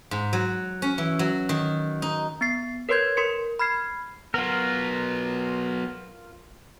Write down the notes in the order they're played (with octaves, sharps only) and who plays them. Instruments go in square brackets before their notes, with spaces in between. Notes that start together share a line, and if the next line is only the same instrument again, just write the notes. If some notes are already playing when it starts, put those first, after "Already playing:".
[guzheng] G#2
F#3
C#4
E3
F#3
D#3
D#4
[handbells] B3 A6 C7
A#4 B4 C#5 C6 G6 G#6
A#4 C6 C#7
B5 F6 G#6 C7
[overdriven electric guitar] F#3 B3 [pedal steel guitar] F4 A#4